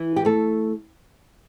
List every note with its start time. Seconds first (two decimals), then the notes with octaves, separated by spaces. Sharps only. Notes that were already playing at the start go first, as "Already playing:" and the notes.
Already playing: E3 E4
0.16 G4
0.25 A3 A4